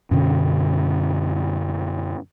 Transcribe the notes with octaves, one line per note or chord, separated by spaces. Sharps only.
F#2 B2 D3 C#4